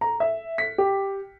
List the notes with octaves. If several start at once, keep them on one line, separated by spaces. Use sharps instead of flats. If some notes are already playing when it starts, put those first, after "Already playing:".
A#5
E5
B6
G4